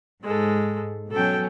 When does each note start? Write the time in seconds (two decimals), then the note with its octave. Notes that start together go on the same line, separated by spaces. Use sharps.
0.24 G#2 G#3 A4
1.12 B2 F#3 C#4 A4 G5